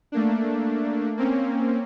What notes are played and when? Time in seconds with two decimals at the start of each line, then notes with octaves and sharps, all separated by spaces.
0.12 A3 A#3 D4
1.17 A#3 C4 C#4